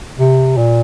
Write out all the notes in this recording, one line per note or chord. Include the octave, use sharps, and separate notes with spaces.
C3
A#2